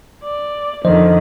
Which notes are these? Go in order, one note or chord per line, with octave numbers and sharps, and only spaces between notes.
D5
F2 D3 D#3 F3 C5 D#5